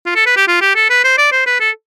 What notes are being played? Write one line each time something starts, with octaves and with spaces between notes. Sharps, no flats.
F4
A4
B4
G4
F4
G4
A4
B4
C5
D5
C5
B4
A4